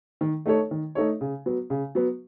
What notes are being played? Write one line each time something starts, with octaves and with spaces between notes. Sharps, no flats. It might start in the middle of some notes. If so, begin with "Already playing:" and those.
D#3
A3 D#4 A4 C#5
D#3
A3 D#4 A4 C#5
C#3
F#3 B3
C#3
F#3 B3